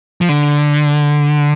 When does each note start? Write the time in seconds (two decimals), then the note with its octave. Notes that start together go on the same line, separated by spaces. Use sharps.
0.21 F3
0.29 D3